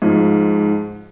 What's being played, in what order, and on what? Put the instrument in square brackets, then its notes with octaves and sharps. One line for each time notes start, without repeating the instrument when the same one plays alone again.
[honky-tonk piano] G#2 F3